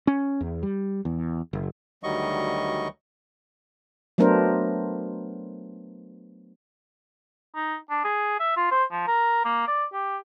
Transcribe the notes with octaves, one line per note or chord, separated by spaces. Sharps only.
C#4
E2
G3
E2
F#1
D2 D#3 F#3 G3 D#5 C#6
F#3 A3 B3 D4 A#4 C5
D#4
D4
G#4
E5
F4
C5
F3
A#4
A#3
D5
G4